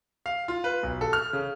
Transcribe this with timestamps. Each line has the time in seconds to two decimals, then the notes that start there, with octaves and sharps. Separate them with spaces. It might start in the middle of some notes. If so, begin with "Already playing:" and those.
0.26 F5
0.48 F4
0.64 B4
0.83 B1
1.01 A4
1.13 F6
1.33 C#3